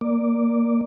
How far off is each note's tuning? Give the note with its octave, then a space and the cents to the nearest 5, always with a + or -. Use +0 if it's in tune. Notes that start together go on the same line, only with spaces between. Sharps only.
A#3 +0 D5 +0